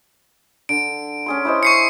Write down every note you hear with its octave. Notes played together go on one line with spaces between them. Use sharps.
D3 D7
C#4 G#4 C6
E4 C5 D#5
C#6 C7 C#7